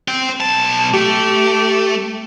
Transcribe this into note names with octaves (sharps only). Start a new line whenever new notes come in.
C5 G5
B1 A5
A3 G4